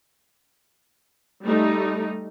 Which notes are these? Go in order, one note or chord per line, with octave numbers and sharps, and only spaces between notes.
G3 A3 D#4